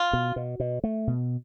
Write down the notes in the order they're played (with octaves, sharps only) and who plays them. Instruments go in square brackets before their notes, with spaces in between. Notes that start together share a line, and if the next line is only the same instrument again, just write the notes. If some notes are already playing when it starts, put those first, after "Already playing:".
Already playing: [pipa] F4
[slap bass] B2
B2
B2
A3
B2